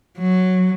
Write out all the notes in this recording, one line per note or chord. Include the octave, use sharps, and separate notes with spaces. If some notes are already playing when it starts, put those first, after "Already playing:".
F#3